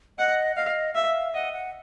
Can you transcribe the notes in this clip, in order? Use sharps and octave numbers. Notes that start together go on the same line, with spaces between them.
D#5 F#5
D#5 F5
E5 F5
D#5 F#5
F#5